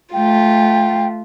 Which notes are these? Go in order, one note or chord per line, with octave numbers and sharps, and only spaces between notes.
A3 F4 G5